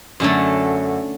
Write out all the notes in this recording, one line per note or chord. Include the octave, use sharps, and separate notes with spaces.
F#2 D3 F#3 A3